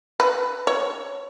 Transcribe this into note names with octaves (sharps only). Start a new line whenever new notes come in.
B4
C#5